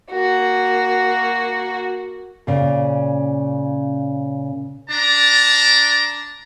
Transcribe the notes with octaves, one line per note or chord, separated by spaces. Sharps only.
A#3 F#4
A#2 C#3
D4 A5 A#5